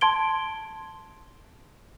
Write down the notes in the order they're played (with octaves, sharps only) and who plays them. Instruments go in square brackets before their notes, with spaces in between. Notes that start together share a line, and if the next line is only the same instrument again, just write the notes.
[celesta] A5 C6 G#6 D7 G7